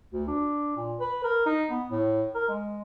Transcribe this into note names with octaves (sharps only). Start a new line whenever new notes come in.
D2
D4
A#2
B4
A#4
D#4
B3
A2
A#4
G#3